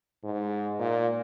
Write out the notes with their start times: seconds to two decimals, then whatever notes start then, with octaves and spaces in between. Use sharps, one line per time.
0.24 G#2
0.79 A#2